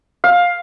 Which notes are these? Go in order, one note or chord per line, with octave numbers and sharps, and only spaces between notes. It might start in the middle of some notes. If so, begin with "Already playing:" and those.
F5